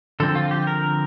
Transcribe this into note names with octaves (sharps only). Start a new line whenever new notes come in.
D3 F3 C4 A4
F4
G4
A#4